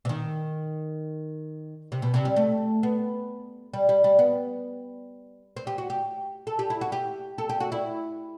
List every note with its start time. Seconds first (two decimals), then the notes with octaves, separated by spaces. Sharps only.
0.05 C3
0.09 D#3
1.92 C3
2.02 B2
2.14 C3
2.25 G3
2.36 A3
2.83 B3
3.74 G3
3.89 G3
4.04 G3
4.19 B3
5.57 C4
5.67 G4
5.78 F#4
5.90 G4
6.47 A4
6.59 G4
6.70 E4
6.81 F#4
6.92 G4
7.38 A4
7.49 G4
7.60 F#4
7.72 E4